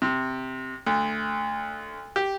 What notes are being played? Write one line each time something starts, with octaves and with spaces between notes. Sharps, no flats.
C3
D2
G4